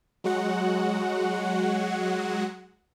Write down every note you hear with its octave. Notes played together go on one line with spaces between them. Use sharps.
F#3 G#3 F#4 F#5